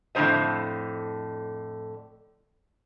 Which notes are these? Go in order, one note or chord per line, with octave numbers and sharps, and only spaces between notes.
F2 A2 D3 A3 C5 D#5